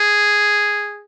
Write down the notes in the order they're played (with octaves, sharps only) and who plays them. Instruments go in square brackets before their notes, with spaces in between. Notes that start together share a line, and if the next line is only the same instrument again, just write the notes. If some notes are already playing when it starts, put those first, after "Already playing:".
Already playing: [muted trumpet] G#4